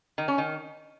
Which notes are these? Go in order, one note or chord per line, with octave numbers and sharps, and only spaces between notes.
D#3
C#4
D#3